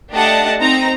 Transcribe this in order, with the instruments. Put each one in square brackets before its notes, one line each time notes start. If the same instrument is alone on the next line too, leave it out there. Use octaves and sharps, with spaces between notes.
[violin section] A3 D4 G4 D#5 F#5 A5
C4 D#4 A#5